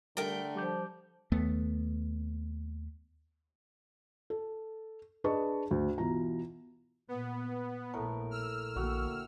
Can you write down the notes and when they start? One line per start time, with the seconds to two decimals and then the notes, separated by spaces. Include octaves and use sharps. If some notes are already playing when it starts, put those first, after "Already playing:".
0.17 D3 G3 A3 A#4 G5
0.56 F3 G3 D6 G6
1.32 D#2 A3 B3
4.30 A4
5.24 D4 G#4 B4 D#5 A5 C#6
5.71 D2
5.98 B2 E3 F4 A#5
7.09 A#2 B3
7.94 A#1 A2 A#4
8.31 E6 F6
8.76 A#1 D3 A#3 F#4 G5